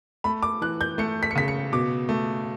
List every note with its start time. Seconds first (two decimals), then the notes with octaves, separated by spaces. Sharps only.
0.24 A3 B5
0.43 D6
0.62 E3 F#6
0.81 G6
0.98 A3 C#7
1.23 B6
1.31 C#7
1.35 C#3 B6
1.48 C#7
1.72 B2 D6
2.09 A3